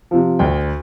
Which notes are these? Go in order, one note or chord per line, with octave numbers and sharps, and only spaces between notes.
C3 F3
D2 G5